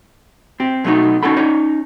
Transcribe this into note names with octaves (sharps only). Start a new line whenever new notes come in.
C4 G4
B2 F#3 A3 B3 C#4 D#4
C#4 D#4 F#4 A4 B5
C#4 D#4 C#5